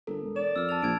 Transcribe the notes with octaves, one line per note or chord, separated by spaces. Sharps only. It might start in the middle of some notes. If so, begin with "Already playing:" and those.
G1 A4 A#4
E1
D5 E7
F2 E6 F6
A5 A6 F7
A#1 G#6 D7